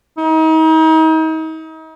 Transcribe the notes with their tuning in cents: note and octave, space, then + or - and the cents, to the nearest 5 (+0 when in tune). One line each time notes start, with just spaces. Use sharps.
D#4 +40